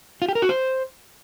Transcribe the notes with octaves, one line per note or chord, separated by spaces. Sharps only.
F4
G4
A#4
F#4
C5